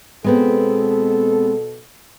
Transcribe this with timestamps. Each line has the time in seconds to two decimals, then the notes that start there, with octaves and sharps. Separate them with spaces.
0.24 B2 G#3 B3 C4 A4